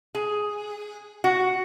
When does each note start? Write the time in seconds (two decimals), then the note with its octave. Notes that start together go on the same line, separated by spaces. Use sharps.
0.15 G#4
1.24 F#4